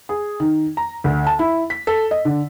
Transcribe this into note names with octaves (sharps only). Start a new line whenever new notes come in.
G#4
D#3
A#5
D2
A5
E4
B6
A4
D#5
D3